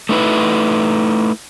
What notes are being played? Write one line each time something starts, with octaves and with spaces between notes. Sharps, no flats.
A3 D#4 E4 B4